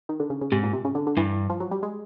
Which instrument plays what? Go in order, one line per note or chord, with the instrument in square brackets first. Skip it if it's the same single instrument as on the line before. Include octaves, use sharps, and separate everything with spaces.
[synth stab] D#3
D3
C#3
C#3
[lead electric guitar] G#2 [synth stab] C3
[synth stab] A#2
C3
C#3
D3
D3
[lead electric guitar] G2 [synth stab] E3
[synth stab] F3
F#3
G3
G#3